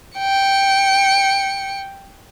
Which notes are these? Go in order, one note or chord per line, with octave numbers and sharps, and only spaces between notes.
G5 C#7